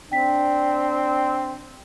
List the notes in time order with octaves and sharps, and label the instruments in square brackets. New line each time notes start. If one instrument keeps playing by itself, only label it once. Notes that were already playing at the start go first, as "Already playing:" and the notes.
[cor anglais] C4 [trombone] D4 [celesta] G5 B6